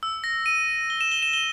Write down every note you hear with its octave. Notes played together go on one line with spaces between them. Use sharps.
E6
A#6
D#7
G7
E7
G7
E7
G7